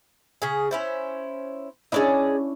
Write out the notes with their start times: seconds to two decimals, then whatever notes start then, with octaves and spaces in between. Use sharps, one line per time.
0.42 C#3 G#4
0.71 C#4 E4 C5
1.92 C#4 D4 E4 G#4 D5 D#5